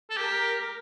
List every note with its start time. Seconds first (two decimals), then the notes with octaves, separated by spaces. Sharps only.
0.11 A4
0.17 G4 A#4